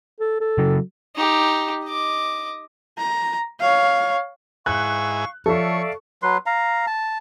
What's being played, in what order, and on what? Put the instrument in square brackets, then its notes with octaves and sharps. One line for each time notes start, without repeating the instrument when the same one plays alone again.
[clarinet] A4
A4
[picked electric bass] C#3 F#3
[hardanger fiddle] D#4 G4
D#5 D6
[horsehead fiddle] A#5
C#5 F5
[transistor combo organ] G#2 E4 G#5 [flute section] F5 C#6 [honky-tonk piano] F#6
[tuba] F3 [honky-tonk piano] A4 C#6 [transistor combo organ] C#5 [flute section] D5 E5 F5
[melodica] F#3 B4 C6
F5 A#5
A5